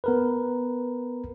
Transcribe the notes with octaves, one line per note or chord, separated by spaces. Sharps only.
B3 A#4 B4